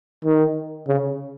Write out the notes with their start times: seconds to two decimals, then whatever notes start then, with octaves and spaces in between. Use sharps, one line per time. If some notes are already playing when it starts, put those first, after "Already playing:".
0.25 D#3
0.88 C#3